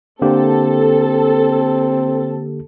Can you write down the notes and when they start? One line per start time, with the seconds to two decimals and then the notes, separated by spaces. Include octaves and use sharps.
0.22 D3 A#3 C4 G4 A4